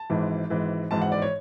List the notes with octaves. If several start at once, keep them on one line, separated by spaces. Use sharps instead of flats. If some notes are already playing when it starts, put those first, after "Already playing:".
Already playing: A5
G#1 G#2 E3
G#1 G#2 E3
G#1 G#2 E3 A5
F#5
D5
C#5